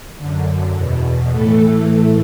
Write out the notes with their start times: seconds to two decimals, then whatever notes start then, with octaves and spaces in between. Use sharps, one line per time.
0.18 F#2 D3
0.74 E2 B2
1.31 A2 E3 A3 A4